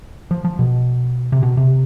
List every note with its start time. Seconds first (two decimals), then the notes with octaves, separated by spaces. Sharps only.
0.31 F3
0.45 F3
0.59 B2
1.32 C3
1.43 B2
1.57 C3